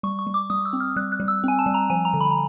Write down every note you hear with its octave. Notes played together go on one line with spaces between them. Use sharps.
G3 C#6
C#6
G3
D6
G3 D#6
E6
C4
F6
G3 F#6
F#6
G3
E6
C4 G#5
A5
G3
A#5
F3 G#5
A#5
D3
B5
A#5